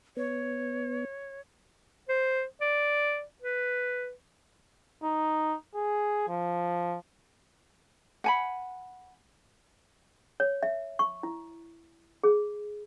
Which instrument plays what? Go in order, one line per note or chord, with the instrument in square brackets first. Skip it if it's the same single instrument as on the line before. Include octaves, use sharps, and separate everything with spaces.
[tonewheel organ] B3 [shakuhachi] C#5
[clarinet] C5
D5
B4
[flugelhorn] D#4
G#4
F3
[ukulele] F#5 G#5 B5
[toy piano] C#5
E5
C#6
E4
G#4